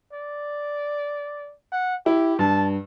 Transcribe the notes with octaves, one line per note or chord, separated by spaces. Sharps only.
D5
F#5
E4 G4
G2 A5